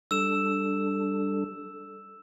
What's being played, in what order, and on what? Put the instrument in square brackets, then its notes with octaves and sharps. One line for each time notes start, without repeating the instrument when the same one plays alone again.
[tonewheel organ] G3 D4 A4 [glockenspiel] E6 E7